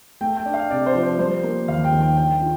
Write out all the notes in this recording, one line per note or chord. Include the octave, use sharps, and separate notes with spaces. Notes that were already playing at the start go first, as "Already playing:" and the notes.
A3 G5
G5
D4
F5
C3 D5
C5
F3
C5
G3 C5
A#3
D#2 F5
G5
D#3
G5
D4 G5
F4